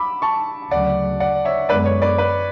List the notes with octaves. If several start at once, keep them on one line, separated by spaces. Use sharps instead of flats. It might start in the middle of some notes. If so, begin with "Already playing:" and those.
Already playing: B5 D6 E6
A5 C#6
D2 C#3 F#3 D5 F#5
D5 F#5
C#5 E5
F#2 D3 G#3 B3 B4 D5
C#5
B4 D5
B4